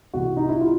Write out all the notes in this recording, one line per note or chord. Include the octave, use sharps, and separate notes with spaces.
C2 C3 E3 F#4
D#4
E4
F4